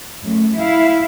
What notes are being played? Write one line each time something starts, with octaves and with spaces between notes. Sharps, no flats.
F#2 A3
E4 F5